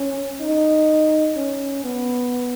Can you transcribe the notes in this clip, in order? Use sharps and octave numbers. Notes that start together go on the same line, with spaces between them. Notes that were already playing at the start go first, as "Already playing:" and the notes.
Already playing: C#4
D#4
C#4
B3